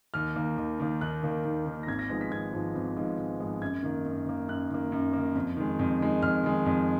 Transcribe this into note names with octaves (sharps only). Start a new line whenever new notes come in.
D#2 F6
D#3 A#3
D#2
D#3 A#3
D#2 F#6
D#3 A#3
D#2
D#3 A#3
A#6
G#1 G#6
A#6
G#2 F3 G#3 B3 A#6
B6
G#1 G#6
G#2 F3 G#3 B3
G#1
G#2 F3 G#3 B3
G#1
G#2 F3 G#3 B3
F#2 G#6
D#3 A#3
F#2
D#3 A#3
F#2 F#6
D#3 A#3
F#2
D#3 A#3
F2
D#3 G#3
F2
D#3 G#3
F2 F6
D#3 G#3
F2